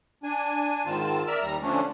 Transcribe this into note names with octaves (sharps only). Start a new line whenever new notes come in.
D4 G#5
G#2 D#3 C4 F4 A5
A#4 D5 E5 E6 F6
D#2 G3 A#5
D3 F3 A3 C#4 D4